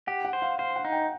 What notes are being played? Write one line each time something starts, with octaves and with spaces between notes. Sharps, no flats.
G4 F#5
F#5
C5
F5
C5 F5
F#5
D#4
G5